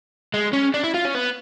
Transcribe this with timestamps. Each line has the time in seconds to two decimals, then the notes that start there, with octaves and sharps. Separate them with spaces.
0.34 G#3
0.53 C#4
0.74 D4
0.84 E4
0.94 F4
1.05 C#4
1.14 B3